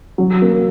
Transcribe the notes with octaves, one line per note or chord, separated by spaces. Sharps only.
F#3
A#3